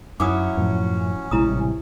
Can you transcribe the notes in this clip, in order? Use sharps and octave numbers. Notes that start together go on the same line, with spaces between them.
F#2 F#3 C#4 E4 D6 D#6
F#2 A2 F3
A#1 C3 G#3 E4 A#5 D#6
A1 C3 G3